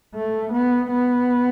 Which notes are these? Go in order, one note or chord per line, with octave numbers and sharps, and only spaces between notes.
A3
B3
B3